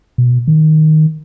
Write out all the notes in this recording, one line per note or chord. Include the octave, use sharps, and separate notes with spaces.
B2
D#3